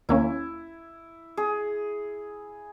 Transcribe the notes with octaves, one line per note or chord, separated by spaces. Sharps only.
D#2 A#3 C#4 E4
G#4